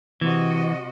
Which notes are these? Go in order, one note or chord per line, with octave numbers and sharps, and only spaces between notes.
C3 E3 F#4 D#5